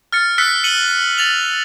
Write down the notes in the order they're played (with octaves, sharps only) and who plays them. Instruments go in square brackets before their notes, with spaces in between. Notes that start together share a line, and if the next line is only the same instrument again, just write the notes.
[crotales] F6 A6 C#7
E6 F#6 A6 B6 C#7
C#7 D#7 F#7 G7
A6 F7 F#7